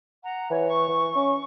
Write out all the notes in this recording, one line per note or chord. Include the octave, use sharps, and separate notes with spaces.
F#5 A#5
E3 C#5
C#6
E3
C#4